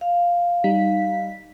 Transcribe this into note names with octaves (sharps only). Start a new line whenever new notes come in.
F5
G3 D#4 B6